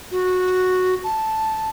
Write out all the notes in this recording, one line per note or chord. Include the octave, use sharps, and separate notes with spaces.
F#4
A5